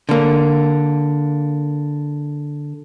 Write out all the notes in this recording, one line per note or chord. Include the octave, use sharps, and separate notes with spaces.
D3 A#3